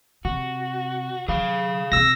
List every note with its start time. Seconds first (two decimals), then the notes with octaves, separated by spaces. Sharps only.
0.25 C3 F#4
1.28 F#3 G#4 F5
1.92 B2 C4 E6 A#6